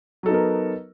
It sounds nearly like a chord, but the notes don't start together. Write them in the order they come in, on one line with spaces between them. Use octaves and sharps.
F#3 A4 D#4 B3 A#4